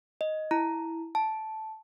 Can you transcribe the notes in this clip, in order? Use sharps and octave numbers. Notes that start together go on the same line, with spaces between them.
D#5
E4 A#5
A5